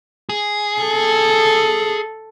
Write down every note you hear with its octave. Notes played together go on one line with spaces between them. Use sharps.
G#4
A4